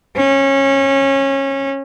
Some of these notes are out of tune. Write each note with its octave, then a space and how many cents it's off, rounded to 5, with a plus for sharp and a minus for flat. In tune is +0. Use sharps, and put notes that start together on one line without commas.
C#4 -20